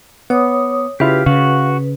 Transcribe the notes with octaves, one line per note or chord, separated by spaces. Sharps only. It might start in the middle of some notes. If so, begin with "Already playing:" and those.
B3 C#5 D6 D#6
C#3 E4 F4 G4 B4 F5
C#3 F#4 F5